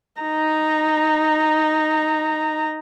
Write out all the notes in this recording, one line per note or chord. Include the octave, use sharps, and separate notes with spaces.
D#4 A#5